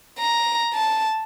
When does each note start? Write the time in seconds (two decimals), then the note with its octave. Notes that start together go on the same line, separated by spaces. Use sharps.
0.19 A#5
0.74 A5